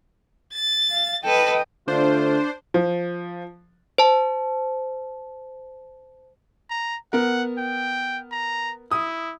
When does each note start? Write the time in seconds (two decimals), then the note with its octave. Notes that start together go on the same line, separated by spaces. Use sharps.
0.54 A6
0.91 F5
1.24 A4 B4 D#5 G5
1.88 D3 A3 D4 F4 C5
2.74 F3
3.98 C5 A5
6.70 A#5
7.13 B3 A#4 F#5
7.58 G5
8.32 A#5
8.91 E4 D#6